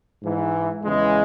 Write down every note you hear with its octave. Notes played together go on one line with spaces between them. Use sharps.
G#2 E3
E2 C#3 E3 G#3